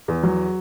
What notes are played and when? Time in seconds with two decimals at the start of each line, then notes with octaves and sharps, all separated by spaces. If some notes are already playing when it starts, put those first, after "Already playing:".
0.08 E2
0.23 F#3